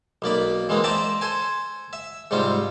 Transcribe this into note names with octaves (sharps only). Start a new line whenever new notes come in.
B1 A#3 D5 B5
E3 G#3 A#3 C4
C5 D5 E5 G5 A5 A#5
A4 C5 G#5
E5
G#2 C3 G3 C4 F4